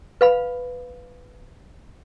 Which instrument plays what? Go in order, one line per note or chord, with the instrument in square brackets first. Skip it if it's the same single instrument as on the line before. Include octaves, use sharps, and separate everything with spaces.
[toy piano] B4 F5 B5